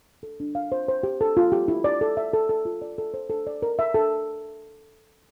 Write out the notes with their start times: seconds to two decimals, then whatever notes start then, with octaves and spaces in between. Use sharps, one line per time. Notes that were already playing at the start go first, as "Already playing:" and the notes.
0.23 A4
0.40 D4
0.55 F5
0.72 C5
0.88 C5
1.03 G4
1.21 A4
1.37 F4
1.52 G4
1.68 E4
1.84 D5
2.01 A4
2.17 E5
2.33 A4
2.49 A4
2.65 F4
2.82 D5
2.98 A4
3.14 C5
3.30 A4
3.47 D5
3.62 A#4
3.79 E5
3.94 A4